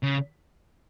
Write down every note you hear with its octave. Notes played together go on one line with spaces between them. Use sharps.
C#3